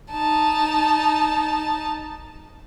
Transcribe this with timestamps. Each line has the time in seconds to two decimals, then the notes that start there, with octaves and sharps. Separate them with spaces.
0.12 D#4 A5